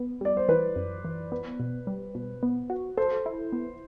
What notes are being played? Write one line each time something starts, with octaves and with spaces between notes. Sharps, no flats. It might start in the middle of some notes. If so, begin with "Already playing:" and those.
Already playing: B3
G3 D5
C5
E3 B4
F#2
E3
B3
B2
G3
B2
B3
F#4
A4 C5
E4
B3